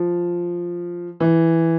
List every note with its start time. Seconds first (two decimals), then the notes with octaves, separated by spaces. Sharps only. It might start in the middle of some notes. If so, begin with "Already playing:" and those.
Already playing: F3
1.20 E3